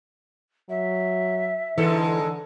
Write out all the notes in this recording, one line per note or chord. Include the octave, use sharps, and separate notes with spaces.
F#3 E5
G#2 D3 E3 G#3 A4